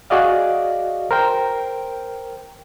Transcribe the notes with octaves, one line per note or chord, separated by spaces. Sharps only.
F#4 G#4 D5 D#5 F5
A#4 C5 G5